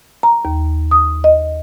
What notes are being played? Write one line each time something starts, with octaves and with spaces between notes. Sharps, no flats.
A#5
D#2
D#6
D#5